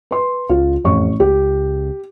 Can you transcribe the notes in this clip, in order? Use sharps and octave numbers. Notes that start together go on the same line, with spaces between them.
B4 C6
C#2 F4
A1 F2 C#6
C#2 G4